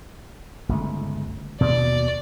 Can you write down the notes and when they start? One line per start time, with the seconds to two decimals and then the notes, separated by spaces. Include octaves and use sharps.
0.69 G1 C#2 A3
1.61 D#2 B2 D5